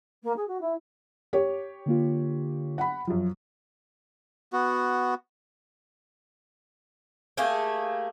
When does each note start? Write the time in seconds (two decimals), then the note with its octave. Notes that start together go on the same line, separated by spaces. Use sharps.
0.23 A#3
0.36 G#4
0.47 F#4
0.61 E4
1.33 G4 C#5
1.86 D3 A#3 F4
2.78 F#5 B5
3.07 F#2 F3
4.53 B3 F#4
7.37 A3 A#3 G4 G#4